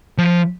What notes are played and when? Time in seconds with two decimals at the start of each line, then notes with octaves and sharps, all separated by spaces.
0.18 F3